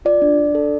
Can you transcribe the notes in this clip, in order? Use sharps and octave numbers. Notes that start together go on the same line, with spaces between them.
F4 D5
D4
D4
A4